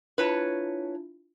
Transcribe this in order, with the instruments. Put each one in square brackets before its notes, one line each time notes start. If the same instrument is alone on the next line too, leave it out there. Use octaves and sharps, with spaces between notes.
[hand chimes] D4 E4 F4 [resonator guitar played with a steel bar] B4 C#5 A5